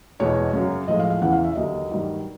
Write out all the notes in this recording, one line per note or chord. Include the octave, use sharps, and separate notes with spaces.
E2 B2 G#3 C#5
F#2 C#3 F#3
A2 F3 G#3 D#5
F5
F5
E2 C#3 E3 F#5
F5
E5
D#2 D3 F#3 D#5
G2 D#3 F#3